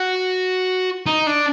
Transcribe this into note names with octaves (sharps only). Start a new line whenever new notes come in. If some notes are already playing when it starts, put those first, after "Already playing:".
Already playing: F#4
D#4
D4